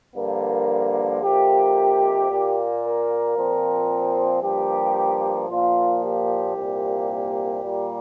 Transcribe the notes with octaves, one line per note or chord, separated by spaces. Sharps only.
G2 D3 F3 A#3 A#4
F2 C3 A#3 G4
A#2 A#3
A#4
A#2 F3 C4
G2 F3 A#3 G4
A#2 F3 A#3 F4
G4
C2 A#2 A#3
A#2 G3 A#3